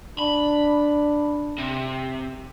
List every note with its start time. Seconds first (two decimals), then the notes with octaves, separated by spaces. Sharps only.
0.19 D4 B5
1.58 C3